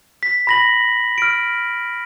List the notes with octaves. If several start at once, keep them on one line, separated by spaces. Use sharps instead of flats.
B6
B5 A#6 F#7
F6 D7